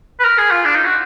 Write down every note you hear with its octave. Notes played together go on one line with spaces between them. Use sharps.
B4
A#4
G#4
F4
D4
D#4
F#4